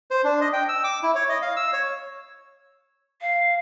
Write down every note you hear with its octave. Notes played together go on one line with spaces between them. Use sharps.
C5
D4
D#5
G5
E6
D6
E4
C#5
D#5
F5
E6
C#5
F5